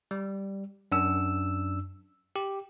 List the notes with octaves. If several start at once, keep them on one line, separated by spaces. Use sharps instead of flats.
G3
F#2 D4 E6
G4